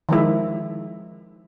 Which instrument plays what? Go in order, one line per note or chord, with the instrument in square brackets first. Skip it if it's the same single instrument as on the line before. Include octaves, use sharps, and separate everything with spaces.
[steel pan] D#3 F3 G#3 E4